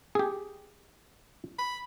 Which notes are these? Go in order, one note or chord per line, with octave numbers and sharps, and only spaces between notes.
G4 G#4
B5